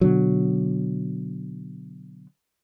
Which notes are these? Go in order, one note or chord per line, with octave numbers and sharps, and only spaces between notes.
B2 D3 F#3